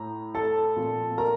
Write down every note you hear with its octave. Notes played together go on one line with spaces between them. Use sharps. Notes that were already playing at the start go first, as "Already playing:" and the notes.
Already playing: A2 A#5
A4 A5
A#2 F3 A3 C4
A#4 A#5